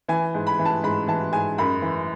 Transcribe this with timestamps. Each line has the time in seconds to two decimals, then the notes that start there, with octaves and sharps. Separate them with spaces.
0.08 E3 G#5
0.34 G#2
0.47 B5
0.59 E3
0.65 A5
0.84 G#2 B5
1.08 E3 A5
1.33 G#2 G#5
1.58 F#2 B5
1.82 E3